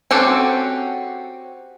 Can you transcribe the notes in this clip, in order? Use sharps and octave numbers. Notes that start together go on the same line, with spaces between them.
C4 C#4 F#4 G4 A4